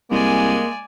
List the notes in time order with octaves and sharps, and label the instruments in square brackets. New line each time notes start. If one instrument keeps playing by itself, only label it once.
[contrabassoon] C2 [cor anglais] G#3 [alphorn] A#3 [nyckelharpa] D5 G#5